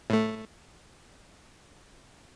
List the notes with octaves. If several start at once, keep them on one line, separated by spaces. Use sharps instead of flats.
A2 A3